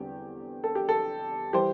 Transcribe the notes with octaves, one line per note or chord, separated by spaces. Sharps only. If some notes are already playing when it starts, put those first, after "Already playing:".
Already playing: E2 D3 G3 C4 G4
A4
G4
A4
E3 G3 G4 C5